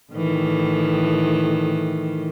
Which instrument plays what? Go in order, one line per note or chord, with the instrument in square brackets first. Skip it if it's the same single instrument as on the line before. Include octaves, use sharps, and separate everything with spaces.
[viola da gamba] A2 D#3 E3